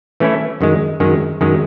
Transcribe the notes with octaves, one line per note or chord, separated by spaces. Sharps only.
E3 A3 C#4 E4
F#2 D#3 G#3
F#2 D#3 G#3
F#2 D#3 G#3